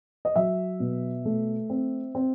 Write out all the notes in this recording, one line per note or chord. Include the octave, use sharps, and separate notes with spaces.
D#5
F#3 E5
B2
A3
C4
C4